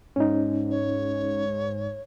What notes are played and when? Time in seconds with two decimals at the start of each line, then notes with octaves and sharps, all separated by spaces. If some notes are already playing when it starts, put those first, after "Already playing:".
0.16 G#2 C#4 D#4
0.70 C#5